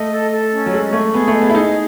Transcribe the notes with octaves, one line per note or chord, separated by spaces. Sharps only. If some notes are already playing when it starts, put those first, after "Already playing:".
Already playing: A3 D#5
A4
A4
C#4
F#3
G#3 D#5
A3 C#6
B3 G#4
A3
D#5
B3
E4
D#4 G#4